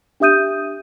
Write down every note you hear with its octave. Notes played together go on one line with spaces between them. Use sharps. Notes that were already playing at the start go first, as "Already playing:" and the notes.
D4 G4 E5 D#6 G6 D#7